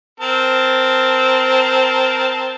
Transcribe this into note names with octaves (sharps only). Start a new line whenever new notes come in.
C4 A#4 A5